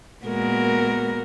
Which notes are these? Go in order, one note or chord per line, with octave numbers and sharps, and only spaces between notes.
A#2 G#3 B3 F#4 A#4